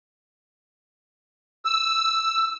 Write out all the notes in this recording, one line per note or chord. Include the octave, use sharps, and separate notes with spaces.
E6